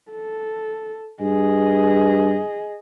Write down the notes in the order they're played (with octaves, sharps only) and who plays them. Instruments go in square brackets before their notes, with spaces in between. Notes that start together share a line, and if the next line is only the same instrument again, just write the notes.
[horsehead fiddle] A4
[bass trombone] G2 [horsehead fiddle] G#4 D#5